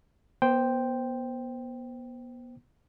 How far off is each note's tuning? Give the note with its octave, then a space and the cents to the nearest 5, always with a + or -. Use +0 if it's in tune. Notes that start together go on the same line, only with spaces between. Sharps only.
B3 -30 C5 +0 G5 +0